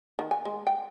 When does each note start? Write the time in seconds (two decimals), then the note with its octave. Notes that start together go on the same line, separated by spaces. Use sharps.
0.19 D#3
0.31 G#5
0.45 G#3
0.67 G5